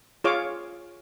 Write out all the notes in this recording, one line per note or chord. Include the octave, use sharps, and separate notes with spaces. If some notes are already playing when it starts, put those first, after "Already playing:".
F4 G#4 C#5 F5 D6